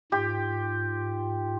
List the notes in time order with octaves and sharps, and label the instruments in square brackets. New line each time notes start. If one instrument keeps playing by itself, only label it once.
[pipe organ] G#2 F4 [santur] G4